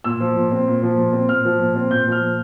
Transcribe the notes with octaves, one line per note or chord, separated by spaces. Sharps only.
A#2 E6
F3
A#2
C4
A#2
F3
A#2
C4
A#2 F6
F3
A#2
C4
A#2 G6
F3
F6
A#2